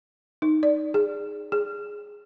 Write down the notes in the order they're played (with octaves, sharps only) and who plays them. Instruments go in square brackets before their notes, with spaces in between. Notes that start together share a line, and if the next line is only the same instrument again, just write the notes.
[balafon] D#4
D5
G#4
G#4